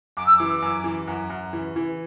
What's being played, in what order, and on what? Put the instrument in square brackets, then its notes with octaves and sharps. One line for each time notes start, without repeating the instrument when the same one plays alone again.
[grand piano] F#2 [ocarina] D6
[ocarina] E6
[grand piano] E3 [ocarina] D6
[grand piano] F#2
E3
F#2
F#2
E3
E3